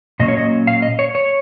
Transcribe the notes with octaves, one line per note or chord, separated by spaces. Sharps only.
A#2 F#3 A#3 C#4 D#5
C#5
D#5
F5
D#5
C#5
C#5